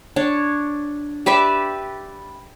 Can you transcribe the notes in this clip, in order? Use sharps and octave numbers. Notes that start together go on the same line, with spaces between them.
D4 C#5
G4 B4 D5 E5